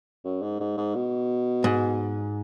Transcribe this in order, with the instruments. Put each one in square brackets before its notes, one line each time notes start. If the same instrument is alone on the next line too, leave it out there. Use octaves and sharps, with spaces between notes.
[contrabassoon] F#2
G#2
G#2
G#2
B2
[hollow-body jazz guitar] G#2